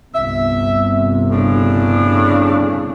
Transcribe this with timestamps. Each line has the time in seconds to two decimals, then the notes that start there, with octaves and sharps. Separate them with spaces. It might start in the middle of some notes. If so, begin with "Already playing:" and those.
0.14 G1 C2 C3 E5
1.31 A2 C#3 D4